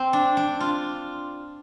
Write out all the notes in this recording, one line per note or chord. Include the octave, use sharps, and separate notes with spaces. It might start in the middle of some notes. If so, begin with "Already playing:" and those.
Already playing: C4
D4
D4
F4